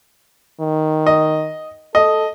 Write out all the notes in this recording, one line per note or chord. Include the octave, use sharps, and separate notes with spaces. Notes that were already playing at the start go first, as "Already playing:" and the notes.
D#3
D#5
A4 D#5